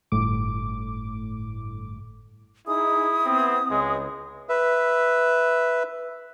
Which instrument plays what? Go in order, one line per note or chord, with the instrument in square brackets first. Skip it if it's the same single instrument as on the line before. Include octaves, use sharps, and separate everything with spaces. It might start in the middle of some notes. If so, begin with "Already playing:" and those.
[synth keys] G1 A2 D6
[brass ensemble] D#4 G#4 [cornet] E4 [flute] D#6
[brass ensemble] B3 C4
[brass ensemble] C#2 [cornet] G#3
[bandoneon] B4 E5